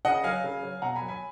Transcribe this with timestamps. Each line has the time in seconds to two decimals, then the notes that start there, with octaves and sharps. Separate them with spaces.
0.05 C#3 D#5 F#5
0.24 F#3 F5 G#5
0.44 C#3
0.63 F#3
0.82 B2 F#5 A#5
0.96 G#5 B5
1.02 F#3
1.08 G#5 B5